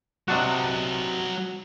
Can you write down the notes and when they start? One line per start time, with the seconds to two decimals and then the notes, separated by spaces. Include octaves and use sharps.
0.28 C3 F#3 D4 F#4 D#5